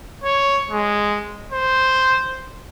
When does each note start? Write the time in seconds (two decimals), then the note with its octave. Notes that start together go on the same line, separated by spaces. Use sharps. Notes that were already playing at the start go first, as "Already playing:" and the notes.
0.24 C#5
0.71 G#3
1.52 C5